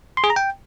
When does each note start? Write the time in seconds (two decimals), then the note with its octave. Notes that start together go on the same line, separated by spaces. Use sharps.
0.17 C6
0.24 G#4
0.30 A#5
0.36 G5